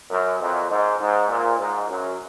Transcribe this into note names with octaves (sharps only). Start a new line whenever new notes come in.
F#2
F2
G#2
G#2
A#2
G#2
F#2